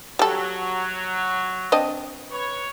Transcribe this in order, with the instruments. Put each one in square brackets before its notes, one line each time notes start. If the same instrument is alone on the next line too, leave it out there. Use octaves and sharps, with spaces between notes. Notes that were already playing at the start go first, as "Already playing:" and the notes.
[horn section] F#3 [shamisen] G3 A4
[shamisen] C4 D4 D#5
[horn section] B4 C#5